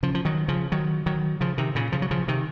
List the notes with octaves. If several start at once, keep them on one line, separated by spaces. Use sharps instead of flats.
C#3 F3
F3
D#3 F#3
C#3 F3
D#3 F#3
D#3 F#3
C#3 F3
C3 D#3
A#2 C#3
C#3 F3
F#3
C#3 F3
C3 D#3